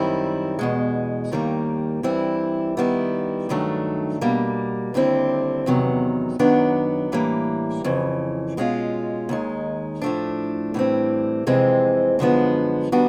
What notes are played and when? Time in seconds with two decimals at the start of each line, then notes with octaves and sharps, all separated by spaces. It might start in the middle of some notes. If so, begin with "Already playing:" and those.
Already playing: F#2 D#3 G3 C4 E4
0.59 E2 B2 G#3
1.31 D#2 D#3 G3 A#3
2.03 G2 E3 G3 C4 E4
2.77 D#3 G3 B3 E4
3.49 G2 D#3 F#3 A3 D4
4.21 B2 G3 A#3
4.94 D#2 D3 G3 C4 E4
5.66 E2 C3 D#3 F#3 B3
6.39 F#2 D#3 F#3 B3 D4
7.12 A2 E3 G3 A#3
7.84 F2 C#3 E3
8.57 B2 G#3 C#4 F4
9.29 D#2 D#3 G#3
10.02 A2 F3 A3 D4
10.74 A2 E3 G3 C4
11.47 F2 C3 E3 G#3 C4
12.19 F#2 D3 F3 G#3 B3
12.92 D#3 G3 B3 D4 F#4